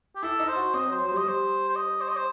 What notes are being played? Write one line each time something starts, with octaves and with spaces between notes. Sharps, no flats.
G4
E4 A4
D#4
C5
F#4
C4 D#5
F#3
C5
F#3
G3 C5
D#5
G3 C5
C5
D#5
C5
D#5
C5